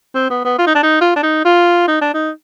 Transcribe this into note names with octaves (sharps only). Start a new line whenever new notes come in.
C4
B3
B3
F4
D#4
D4
D#4
F4
D4
D#4
F4
D#4
D4
D#4